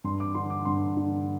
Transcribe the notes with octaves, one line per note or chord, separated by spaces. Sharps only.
G2 C6
D6
D3 C6
D6
G2 C6
D3